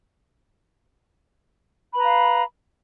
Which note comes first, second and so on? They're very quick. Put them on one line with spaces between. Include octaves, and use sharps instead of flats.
B5 B4 A#5 F5